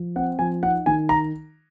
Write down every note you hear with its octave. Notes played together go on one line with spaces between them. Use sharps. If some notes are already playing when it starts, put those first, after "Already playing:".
Already playing: F3
C4 F#5
F3 G#5
D#4 F#5
D#3 G#5
A#5